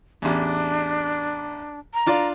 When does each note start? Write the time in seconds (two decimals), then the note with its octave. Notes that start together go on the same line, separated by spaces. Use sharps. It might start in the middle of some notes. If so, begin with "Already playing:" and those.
0.22 A1 E2 D4
1.94 A#5
2.07 D4 F4 D5